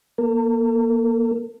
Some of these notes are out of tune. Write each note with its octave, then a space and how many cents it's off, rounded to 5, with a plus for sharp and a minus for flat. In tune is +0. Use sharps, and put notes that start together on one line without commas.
A#3 +20 A4 +45